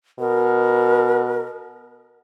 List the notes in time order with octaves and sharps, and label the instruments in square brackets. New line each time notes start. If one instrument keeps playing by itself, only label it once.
[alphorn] B2 [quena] A#4